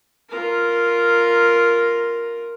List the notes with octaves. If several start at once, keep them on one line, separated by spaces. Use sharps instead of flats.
F4 A#4